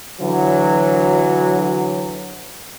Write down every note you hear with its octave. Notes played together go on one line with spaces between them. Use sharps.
D3 E3 F#3